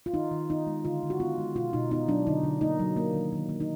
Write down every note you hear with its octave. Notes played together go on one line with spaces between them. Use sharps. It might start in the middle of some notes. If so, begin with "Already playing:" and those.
F4
D#3 D#4
D#3
B3 D#4
G#3
D3 F4
D3
F#4
B3 F4
G#3
B2 F4
B2 D#4
B3 D#4
F#3 D4
D3 D#4
D3
A#3 D#4
F#3
A#3
D#3
D#3
A#3
D#4